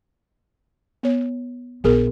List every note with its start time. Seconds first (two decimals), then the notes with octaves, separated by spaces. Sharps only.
1.03 B3 C#5
1.84 A#1 B3 G#4 A#4